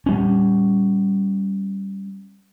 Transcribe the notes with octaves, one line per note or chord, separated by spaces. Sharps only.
G3 C#4